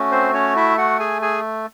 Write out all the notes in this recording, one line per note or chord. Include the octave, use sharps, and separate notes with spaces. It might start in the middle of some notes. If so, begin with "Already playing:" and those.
Already playing: A3 C#4 F#4
C4 C5
C#4 C#5
E4 E5
F#4 F#5
G#4 G#5
G#4 G#5